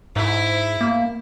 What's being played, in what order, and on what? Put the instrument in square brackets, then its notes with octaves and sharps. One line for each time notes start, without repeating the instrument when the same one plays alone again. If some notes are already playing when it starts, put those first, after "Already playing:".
[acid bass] G#2 [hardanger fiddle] E4
[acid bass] A#3